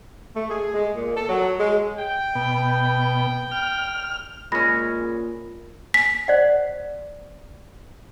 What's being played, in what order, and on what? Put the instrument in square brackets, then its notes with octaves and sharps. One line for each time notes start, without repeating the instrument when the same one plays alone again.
[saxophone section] A3
G#4
G#3
A#2
A4
F#3
G#3
[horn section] G5
[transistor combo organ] B2
F6
[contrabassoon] A#2 [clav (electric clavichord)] G#3 C#4 [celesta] B5 A#6
[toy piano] G#5 [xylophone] B6
[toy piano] C5 D5 F#5